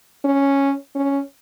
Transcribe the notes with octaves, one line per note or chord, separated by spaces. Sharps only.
C#4
C#4